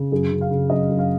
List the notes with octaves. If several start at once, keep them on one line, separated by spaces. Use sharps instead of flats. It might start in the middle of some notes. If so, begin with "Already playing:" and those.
Already playing: C#3
F#2 G#4
C#3
F5
C#3
F#2 D#5
F#2
F5